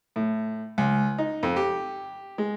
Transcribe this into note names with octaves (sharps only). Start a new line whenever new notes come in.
A2
C#2
D#4
F2
G4
G#3